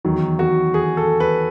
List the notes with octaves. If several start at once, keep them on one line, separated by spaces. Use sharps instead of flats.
E2 D#3 F#3
F#4
G#4
A4
B4